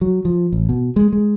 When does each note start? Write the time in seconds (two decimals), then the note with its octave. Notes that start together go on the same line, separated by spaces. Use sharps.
0.01 F#3
0.25 F3
0.53 A1
0.69 B2
0.96 G#3
1.13 G#3